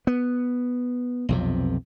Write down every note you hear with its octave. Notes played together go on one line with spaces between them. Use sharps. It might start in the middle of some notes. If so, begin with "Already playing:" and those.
B3
B1 F2 C3